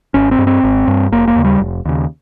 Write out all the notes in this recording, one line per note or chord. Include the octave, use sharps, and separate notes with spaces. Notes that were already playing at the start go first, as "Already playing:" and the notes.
G#1 C#4
C4
G2
C4
G#1
G2
F1 A#3
A#3
D#2 C#3
G3
F1
D#2 C#3